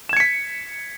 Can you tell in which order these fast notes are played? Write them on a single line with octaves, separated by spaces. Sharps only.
E7 G#6 C#7 B6